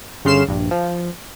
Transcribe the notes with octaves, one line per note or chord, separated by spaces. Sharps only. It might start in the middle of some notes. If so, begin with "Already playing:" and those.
G1 C#3 C6 F6 C7 E7
A#1 G2
F3